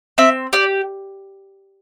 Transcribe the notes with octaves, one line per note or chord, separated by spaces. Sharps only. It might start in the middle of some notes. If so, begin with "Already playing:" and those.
C4 E5
G4 D5